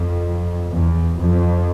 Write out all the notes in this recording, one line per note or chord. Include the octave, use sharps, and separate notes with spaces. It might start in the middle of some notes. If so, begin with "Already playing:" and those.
Already playing: F2
E2
F2